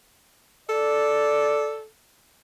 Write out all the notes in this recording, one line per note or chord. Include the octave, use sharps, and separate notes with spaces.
A4 D5